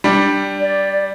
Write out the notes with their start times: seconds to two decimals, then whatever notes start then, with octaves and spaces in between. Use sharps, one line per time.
0.04 G3 D4
0.60 D5